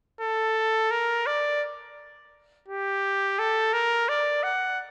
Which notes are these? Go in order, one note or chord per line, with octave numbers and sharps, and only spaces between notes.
A4
A#4
D5
G4
A4
A#4
D5
F#5